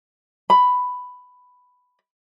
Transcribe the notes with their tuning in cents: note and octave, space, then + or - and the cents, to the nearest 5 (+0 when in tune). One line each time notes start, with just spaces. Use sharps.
B5 +5